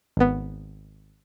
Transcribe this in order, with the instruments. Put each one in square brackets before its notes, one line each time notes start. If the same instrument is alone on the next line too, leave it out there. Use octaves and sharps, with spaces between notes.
[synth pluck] G#1 B3